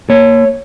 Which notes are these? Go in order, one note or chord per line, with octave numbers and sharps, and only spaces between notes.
A#3 C#5